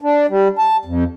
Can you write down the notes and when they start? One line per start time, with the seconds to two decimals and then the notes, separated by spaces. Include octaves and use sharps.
0.02 D4
0.29 G3
0.59 A5
0.85 F2